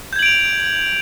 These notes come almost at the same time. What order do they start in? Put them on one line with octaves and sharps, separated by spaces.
G6 G#6 F#7 D7 F7